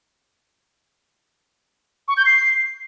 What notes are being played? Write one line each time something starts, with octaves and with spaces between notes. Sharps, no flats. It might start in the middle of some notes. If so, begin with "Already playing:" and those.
C#6
G6
C7